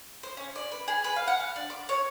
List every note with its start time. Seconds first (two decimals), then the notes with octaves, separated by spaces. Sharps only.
0.23 C5
0.37 C#4
0.56 D5
0.72 B4
0.88 G#4
1.04 B4
1.16 F5
1.27 F#5
1.40 F5
1.56 D4
1.70 D6
1.89 C#5